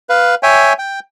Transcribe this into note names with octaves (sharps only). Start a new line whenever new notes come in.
B4 F5
C#5 E5 G5 G#5
G5